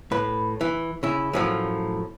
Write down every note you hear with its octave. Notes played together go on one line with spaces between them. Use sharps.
A2 B4
E3
C#3 E4
F#2 A2 F3